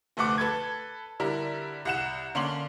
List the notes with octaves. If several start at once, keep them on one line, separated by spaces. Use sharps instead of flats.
F1 D2 A3 F#5 D6
A4 B4 G#6
D3 G3 E4 A#4
C2 F#5 E7
D3 A#3 C#4 C6 F#7